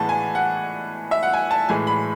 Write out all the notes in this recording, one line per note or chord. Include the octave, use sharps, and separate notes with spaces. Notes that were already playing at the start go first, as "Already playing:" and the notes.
Already playing: A2 E3 G#3 B3 A5
G#5
F#5
E5
F#5
G#5
A5
A2 E3 G#3 G#5
B5